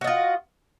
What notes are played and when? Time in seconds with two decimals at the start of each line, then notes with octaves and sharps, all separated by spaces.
0.01 F#4
0.04 D#5
0.07 F4